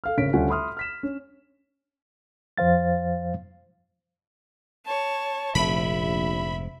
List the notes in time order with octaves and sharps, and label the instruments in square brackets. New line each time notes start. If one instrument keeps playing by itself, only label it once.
[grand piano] A4 F5 F6
G#1 C#3 C#4 B6 D7
D2 G3 C#4 F4 F#5 G#5
E5 B5 C6 D#6 F6
F6 B6 E7
C#4
[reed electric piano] F2 F3 C5 F5 A6
[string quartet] C#5 A5
[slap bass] F1 G#2 C3 [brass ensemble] A#1 [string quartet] E5 [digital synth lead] B5